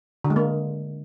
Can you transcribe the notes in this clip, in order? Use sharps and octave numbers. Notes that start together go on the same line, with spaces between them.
D3
G#3
A#3